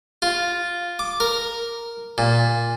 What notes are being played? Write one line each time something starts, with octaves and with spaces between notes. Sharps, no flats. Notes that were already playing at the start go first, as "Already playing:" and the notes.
F4
D6
A#4
A#2